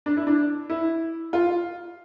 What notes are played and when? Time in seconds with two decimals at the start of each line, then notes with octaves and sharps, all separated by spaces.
0.06 D4
0.17 E4
0.27 D4
0.70 E4
1.33 F4